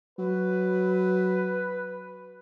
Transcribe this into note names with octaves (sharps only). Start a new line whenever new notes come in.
F#3 B4